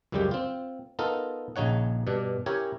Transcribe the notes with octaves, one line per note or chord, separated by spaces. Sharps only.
C#2 F#2 C#3 G3 G#3 G4
C4 F4
B3 D#4 F4 A4 A#4
A#1 C#3 D#4 C#5 F#5
G2 B2 D4
C#4 E4 G4 A#4 C#5 G#5